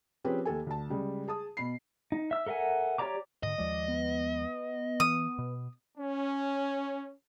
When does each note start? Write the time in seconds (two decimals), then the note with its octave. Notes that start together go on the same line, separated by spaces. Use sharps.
0.24 F3 C4 C#4 G4 G#4 B4
0.45 D#2 G4 A4 G#5
0.67 D2 A5
0.90 C#3 G3 G#3
1.28 G#4 A5 D#6
1.57 B2 B5 C7
2.12 D#4
2.31 E5 E6
2.47 A4 A#4 E5 F#5 G#5
2.98 G4 C#5 D5 A#5 D6
3.43 G#2 D3 D#5
3.58 D#2 F3 G#3 D5
3.88 B3
5.00 E3 D#6
5.39 B2
5.98 C#4